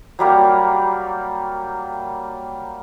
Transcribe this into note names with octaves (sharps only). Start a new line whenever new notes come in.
F#3 G3 A#3 G4